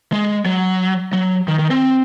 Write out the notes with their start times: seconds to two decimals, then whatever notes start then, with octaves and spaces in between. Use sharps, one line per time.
0.12 G#3
0.46 F#3
1.13 F#3
1.48 D#3
1.59 D#3
1.71 C4